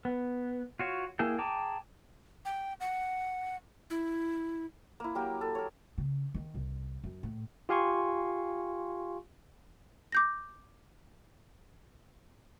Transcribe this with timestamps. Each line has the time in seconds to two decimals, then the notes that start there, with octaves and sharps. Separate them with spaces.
0.05 B3
0.80 F4 F#4 C#5
1.19 A#3 E4 G#4 G5
1.38 G#4 G5 A5 A#5 D6
2.45 G5
2.80 F#5
3.90 E4
5.00 A#3 E4
5.15 F#3 A#3 G4 A#4
5.41 A4
5.55 A#4 C#5
5.98 C#3
6.34 D#3
6.54 C2
7.04 F#2
7.23 A2
7.69 F4 G4 F5 G#5 C6 C#6
10.12 D6 G6 A#6